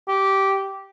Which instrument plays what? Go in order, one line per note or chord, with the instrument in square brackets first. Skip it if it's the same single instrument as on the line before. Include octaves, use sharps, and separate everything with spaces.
[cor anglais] G4